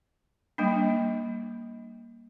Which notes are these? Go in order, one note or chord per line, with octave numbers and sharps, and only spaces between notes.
G3 A#3 D4